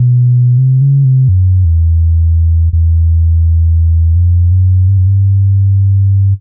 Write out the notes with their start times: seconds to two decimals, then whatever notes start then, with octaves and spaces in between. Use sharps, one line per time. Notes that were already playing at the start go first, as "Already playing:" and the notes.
Already playing: B2
0.58 C3
0.81 C#3
1.05 C3
1.29 F#2
1.65 E2
2.73 E2
4.16 F2
4.52 F#2
4.88 G2
4.98 F#2
5.07 G2